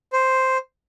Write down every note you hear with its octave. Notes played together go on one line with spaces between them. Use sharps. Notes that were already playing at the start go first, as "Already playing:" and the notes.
C5